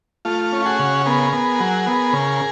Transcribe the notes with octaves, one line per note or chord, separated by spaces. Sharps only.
A3 F4
C#4
F#4 G#4
C#3
B3 G#4 A#4
B3
F#3
B3
C#3